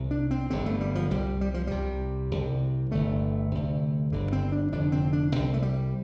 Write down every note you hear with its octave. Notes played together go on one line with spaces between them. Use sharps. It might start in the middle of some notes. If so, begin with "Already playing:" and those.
Already playing: C2 C3
D4
C4
G1 G2 D3 C4
A3
G3
F3
C2 C3 G3
G3
F3
C2 C3 G3
C2 C3
G1 G2 D3 A3
D2 C3
G1 G2 D3
C4
D4
F1 F2 D3 D4
C4
D4
C2 C3 C4
A3
G3